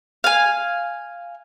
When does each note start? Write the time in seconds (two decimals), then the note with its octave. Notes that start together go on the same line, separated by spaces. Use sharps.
0.24 F5 G#5